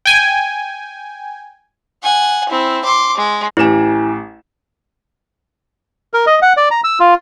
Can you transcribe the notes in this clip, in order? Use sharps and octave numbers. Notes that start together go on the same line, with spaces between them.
G5 G#5
F#5 G#5
C4 E4
C6 D6
G#3
A1 E4 G4 G#5 E7
A#4
D#5
F#5
D5
A#5
E6
F4